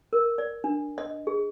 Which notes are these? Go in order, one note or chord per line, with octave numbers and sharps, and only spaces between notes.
A#4
D5
D4
D#5
G#4